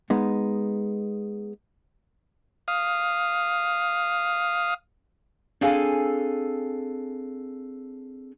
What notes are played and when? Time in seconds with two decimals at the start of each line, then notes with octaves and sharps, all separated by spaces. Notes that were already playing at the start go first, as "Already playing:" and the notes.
0.10 G#3 B3 D#4
2.68 F5 D#6
5.61 C4 D4 G#4 A4 F5 G#5